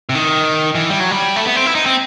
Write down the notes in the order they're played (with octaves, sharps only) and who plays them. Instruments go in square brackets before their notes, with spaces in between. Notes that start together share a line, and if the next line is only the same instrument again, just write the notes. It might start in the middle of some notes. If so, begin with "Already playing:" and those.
[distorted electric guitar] C3
D#3
E3
G3
F#3
G3
A3
B3
C4
E4
D#4
C4